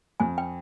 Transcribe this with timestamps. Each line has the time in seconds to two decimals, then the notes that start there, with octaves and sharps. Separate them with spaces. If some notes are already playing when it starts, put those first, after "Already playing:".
0.20 F2 G#5
0.38 G5